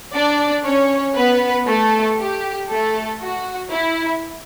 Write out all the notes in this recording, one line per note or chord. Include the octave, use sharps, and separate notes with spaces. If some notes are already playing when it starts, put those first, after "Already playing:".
D4 D5
C#4 C#5
B3 B4
A3 A4
G4
A3 A4
F#4
E4